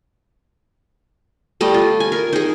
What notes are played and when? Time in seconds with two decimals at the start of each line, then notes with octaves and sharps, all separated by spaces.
1.61 G3 A3 D#5
1.74 F4
2.00 G#5
2.12 A#4
2.33 D#4 G#4